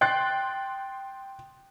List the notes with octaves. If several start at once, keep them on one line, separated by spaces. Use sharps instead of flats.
G5 C6 F#6 A6 C7